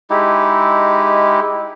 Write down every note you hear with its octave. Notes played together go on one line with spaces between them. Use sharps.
G#3 D#4 E4 G4